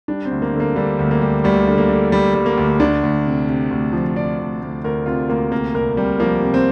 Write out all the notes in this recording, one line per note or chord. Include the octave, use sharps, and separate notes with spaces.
G3 D4
C4
D2
A#3
D3
A#3
D3 G3
D2
A#3
G3
D2 G3
D3
A#3
D3
G3
G3
A#3
D2
D2 D4
D2
C3
C3
D2
F3
C3 D5
D2
D2
D2 A#4
C3 F4
D2 A#3
C3 A#3
C2 A#4
C3 G3
F3 A#3
C3
C4